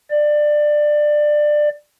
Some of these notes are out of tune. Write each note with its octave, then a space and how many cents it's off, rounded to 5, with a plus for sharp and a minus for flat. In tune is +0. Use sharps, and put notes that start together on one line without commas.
D5 +20